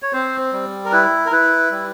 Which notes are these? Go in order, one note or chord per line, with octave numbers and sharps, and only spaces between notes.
C#5
C4 C5
G3
A#4
E4 B4
A#4
E4 B4
G3